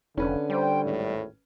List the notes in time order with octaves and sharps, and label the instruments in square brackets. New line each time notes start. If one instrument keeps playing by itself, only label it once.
[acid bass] F1 [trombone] D3 [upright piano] C#4 B4
[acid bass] G3 [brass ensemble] C5 G5
[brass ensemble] G#1 E2 A2